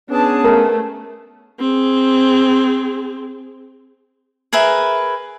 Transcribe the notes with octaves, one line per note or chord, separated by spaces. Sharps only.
B3 C#4 D4 G#4 A5
A3 A#4
C4 G#4
G#4 A#4 B4 E5